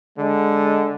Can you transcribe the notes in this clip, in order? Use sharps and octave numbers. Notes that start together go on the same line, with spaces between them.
D3 G#3